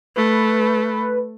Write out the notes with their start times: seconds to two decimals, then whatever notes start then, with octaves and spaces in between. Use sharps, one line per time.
0.16 A3 B4